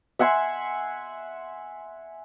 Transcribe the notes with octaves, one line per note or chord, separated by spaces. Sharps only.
E5 F#5 G#5 C6